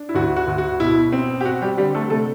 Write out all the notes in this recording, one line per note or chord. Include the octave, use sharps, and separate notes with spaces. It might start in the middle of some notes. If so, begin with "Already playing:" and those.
Already playing: D4
E4
D2 F#4
F#4
D2
F#4
B2 E4
C4
G4
C4 F#4
G3 G4
D3 G3 G4
A3 A4
C3 A3 A4